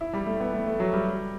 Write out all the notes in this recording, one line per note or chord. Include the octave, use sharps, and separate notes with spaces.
E4
G3
A3
B3
A3
A3
F#3
G3